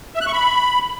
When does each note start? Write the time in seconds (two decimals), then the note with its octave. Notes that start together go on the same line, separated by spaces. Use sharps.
0.14 E5
0.21 F#6
0.27 C#6
0.33 B5